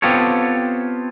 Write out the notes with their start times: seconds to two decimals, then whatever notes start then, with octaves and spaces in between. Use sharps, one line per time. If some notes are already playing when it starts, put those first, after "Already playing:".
0.02 B3 C4 F4 G4 A4 C#5